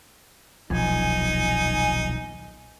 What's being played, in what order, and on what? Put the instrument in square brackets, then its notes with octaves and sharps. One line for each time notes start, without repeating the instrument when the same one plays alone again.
[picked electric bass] D#1 B1 F3 [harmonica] D#4 [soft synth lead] G#5